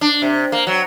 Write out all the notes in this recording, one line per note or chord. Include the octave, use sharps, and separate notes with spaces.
D4
C3
A#3
F#3